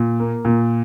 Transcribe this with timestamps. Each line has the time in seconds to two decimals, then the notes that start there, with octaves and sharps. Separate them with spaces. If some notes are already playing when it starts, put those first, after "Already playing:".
Already playing: A#2
0.20 A#3
0.45 A#2